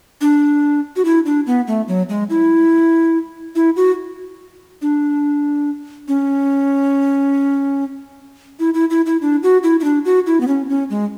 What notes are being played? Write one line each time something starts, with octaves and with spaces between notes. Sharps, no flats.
D4
F#4
E4
D4
B3
A3
F#3
G#3
E4
E4
F#4
D4
C#4
E4
E4
E4
E4
D4
F#4
E4
E4
D4
F#4
E4
B3
C#4
C#4
G#3